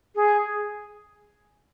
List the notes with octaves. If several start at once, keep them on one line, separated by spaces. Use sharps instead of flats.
G#4